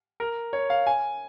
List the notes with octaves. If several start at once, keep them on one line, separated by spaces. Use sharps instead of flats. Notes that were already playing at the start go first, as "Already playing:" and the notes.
A#4
C#5
F5
G#5